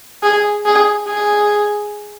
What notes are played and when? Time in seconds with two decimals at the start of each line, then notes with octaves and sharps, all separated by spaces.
0.23 G#4
0.65 G#4
1.07 G#4